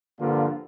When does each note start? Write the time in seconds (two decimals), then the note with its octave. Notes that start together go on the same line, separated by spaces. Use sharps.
0.19 G2 D3 F3 A#3 F4